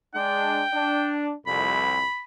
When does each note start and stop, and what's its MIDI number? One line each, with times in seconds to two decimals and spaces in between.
0.15 0.63 56
0.15 0.63 62
0.15 1.13 79
0.74 1.32 62
1.47 2.02 36
1.47 2.02 41
1.47 2.23 83